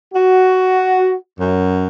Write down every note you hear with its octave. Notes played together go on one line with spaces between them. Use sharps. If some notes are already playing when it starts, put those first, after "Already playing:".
F#4
F#2